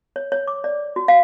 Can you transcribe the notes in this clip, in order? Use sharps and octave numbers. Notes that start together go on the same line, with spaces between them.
C#5
C#5
D6
D5
F#4
F5